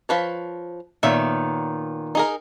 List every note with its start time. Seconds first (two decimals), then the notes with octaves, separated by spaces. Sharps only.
0.09 F3 B4 C#5
1.03 A#2 D#3 B3 C#5 E5 F5
2.15 D#4 G#4 A#4